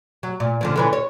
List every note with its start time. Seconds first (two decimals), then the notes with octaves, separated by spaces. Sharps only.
0.23 F#3
0.40 A#2
0.61 D3 F3 C#4
0.76 D3 E3 C#4
0.93 C#5